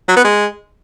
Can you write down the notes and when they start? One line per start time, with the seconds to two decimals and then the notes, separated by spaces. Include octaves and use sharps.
0.08 F#3
0.16 B3
0.25 G#3